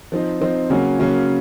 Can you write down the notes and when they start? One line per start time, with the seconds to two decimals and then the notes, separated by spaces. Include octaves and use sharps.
0.12 F3 C4 D#4
0.41 F3 C4 D#4
0.70 C#3 F#3 A#3 C#4 F#4
0.99 C#3 F#3 A#3 C#4 F#4